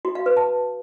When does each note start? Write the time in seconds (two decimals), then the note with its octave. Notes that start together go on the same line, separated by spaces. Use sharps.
0.05 F#4
0.15 F5
0.26 B4
0.37 A5